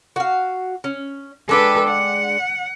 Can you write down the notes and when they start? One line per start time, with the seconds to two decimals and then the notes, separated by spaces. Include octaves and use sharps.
0.16 F#4 F5
0.84 C#4
1.49 G#3 D4 A4 B4 G5
1.87 F#5